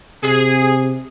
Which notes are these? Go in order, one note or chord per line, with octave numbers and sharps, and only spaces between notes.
C3 G#4